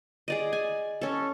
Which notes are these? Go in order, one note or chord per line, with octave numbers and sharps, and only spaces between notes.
G#4 D5 D#5
G#5
C#4 A4